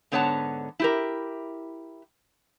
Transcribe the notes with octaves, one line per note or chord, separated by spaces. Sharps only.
G#2 D3 B3 C#5 F#5 A5
E4 G4 A#4